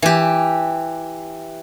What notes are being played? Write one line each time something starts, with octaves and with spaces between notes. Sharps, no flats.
E3 G4